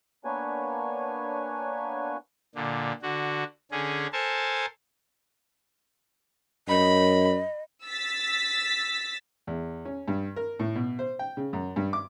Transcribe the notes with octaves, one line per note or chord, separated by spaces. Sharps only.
A#3 B3 D4 B4 C#5 G#5
A#2 D3
D3 F#4
D3 C#4 G#4
A4 A#4 C5 G#5 A5
F#2 D#5 B5
E6 A6 B6
E2
C#4
G2
A#4
A2
B2
C5
G5
C#3
F#2
G2
D6